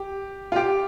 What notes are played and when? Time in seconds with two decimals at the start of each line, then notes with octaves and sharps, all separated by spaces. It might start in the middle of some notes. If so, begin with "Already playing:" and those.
Already playing: G4
0.52 F4
0.56 G4